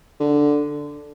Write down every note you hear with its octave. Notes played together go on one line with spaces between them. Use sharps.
D3